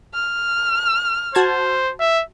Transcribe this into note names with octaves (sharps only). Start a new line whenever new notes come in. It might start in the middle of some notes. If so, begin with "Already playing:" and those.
F6
F#4 C5 A5 G#6
E5